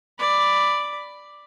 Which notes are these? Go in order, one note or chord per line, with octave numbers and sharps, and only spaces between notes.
D5 B5